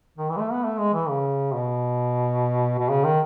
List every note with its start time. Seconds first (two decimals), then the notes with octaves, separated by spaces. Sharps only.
0.18 D#3
0.30 E3
0.37 G#3
0.40 A3
0.52 B3
0.63 A3
0.79 G#3
0.94 E3
1.09 C#3
1.54 B2
2.79 B2
2.90 C#3
3.04 D#3